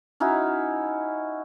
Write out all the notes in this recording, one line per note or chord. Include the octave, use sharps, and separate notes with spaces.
C#4 D#4 E4 F#4